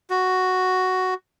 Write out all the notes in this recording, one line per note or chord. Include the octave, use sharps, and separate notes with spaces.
F#4